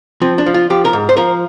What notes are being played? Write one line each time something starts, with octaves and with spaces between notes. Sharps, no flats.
F3 C4
D4
F3
F4
F3 G4
A#4
G#2
C5
F3 A#4